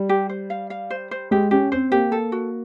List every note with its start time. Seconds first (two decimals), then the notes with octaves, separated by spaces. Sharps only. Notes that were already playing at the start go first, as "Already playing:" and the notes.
Already playing: G3
0.09 G4
0.29 C5
0.50 F5
0.70 F5
0.90 C5
1.11 C5
1.31 G#3 G4
1.51 C#4 G4
1.72 C4 C5
1.92 A#3 G4
2.12 A4
2.32 F#4